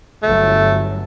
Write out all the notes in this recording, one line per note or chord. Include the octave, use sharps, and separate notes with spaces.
G1 F#3 A3